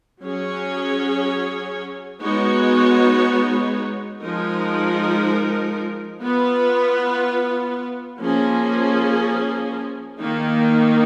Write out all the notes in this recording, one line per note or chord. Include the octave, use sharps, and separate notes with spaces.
F#3 C#4 G#4 C#5
G#3 B3 D#4 F#4 C#5
F3 G#3 D#4 A#4
B3 F4 B4
F3 A#3 C#4 G#4
D#3 A#3 D#4